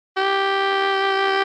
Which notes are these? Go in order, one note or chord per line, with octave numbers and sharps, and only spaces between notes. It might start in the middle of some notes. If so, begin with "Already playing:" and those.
G4